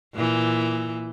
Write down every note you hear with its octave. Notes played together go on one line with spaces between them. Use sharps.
A#2 E3